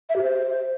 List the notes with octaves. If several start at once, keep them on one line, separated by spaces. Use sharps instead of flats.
E5
G4
C5